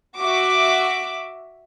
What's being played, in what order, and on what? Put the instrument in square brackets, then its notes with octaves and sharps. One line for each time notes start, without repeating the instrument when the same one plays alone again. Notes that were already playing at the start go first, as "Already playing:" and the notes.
[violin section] F#4 E5 D6